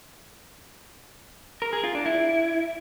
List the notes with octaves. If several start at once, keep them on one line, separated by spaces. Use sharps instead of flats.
A#4
G#4
F4
D4
E4